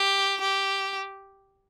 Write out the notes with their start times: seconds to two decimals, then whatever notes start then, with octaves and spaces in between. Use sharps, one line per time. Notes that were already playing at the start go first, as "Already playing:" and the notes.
Already playing: G4
0.41 G4